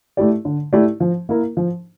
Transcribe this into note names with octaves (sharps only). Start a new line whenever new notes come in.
A3 E4 G4 D5
D3
A3 E4 G4 D5
F3
A#3 E4 A#4
F3